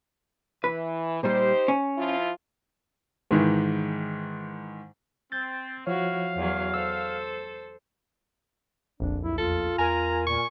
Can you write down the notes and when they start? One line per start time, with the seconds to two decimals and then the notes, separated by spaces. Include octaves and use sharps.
0.64 E3 B4
1.23 A#2 G3 D#4 G4 C5
1.68 C#4
1.98 F3 E4 F4
3.31 G#2 D#3 E3
5.32 C4 G6 A6
5.87 F3 E4 F#4 C#5 F5
6.36 E2 F#3
6.74 A4 C5 E6
9.00 D#1 A#1 F2 D4
9.23 B1 E4
9.38 E2 F4 A4
9.78 E2 A#4 G#5 A#5
10.27 A#2 C#6